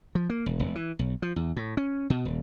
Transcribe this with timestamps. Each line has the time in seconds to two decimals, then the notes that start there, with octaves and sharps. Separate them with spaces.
0.15 F3
0.30 A#3
0.46 E1
0.59 E1
0.75 E3
0.99 B1
1.22 F3
1.36 E2
1.56 A2
1.77 C#4
2.10 B2
2.25 D#1